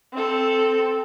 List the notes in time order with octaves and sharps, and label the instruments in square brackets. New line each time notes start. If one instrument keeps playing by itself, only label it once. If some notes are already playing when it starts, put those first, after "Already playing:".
[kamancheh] C4 A4